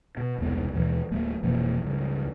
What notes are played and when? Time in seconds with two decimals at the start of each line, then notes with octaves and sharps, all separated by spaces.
0.17 B2
0.38 E1 C2 B3
0.73 D#2 B2 E3
1.11 D1 A3 A#3
1.43 F1 B2 E3 A#3
1.84 C#2 G2